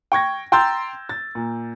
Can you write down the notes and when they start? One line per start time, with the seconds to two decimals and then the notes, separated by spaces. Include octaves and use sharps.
0.12 G5 C#6 G#6 A#6
0.52 G5 A#5 C6 E6 G6 A6
1.09 A6
1.35 A#2